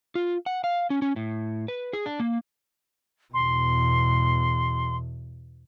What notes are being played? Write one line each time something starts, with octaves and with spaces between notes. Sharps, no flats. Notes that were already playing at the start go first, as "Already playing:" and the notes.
F4
F#5
F5
C#4
C#4
A2
B4
G#4
D4
A#3
E2 B2 C6